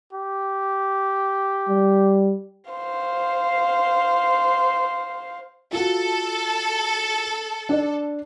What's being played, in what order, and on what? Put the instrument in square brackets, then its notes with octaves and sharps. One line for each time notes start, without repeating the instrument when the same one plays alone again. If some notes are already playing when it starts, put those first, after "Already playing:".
[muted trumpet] G4
[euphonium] G3
[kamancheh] C5 F5
[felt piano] F4 F#4 [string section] A4
[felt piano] D4 D5